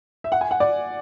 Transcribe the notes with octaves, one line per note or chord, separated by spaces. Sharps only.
E5
F#5
G#5
F#5
D5